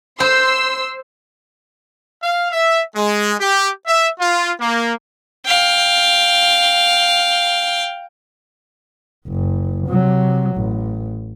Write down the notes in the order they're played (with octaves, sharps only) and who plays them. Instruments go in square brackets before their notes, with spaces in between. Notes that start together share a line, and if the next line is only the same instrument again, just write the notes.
[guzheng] C5 [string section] C6 E6
[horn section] F5
E5
G#3
G4
E5
F4
A#3
[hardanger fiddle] F5 G5
[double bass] F#1
C3 F#3
A1